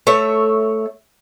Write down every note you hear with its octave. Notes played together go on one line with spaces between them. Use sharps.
A3 C#5 E5